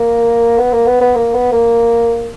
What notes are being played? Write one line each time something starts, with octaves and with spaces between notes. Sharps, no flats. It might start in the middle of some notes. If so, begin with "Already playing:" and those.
Already playing: A#3
B3
A#3
B3
B3
A#3
B3
A#3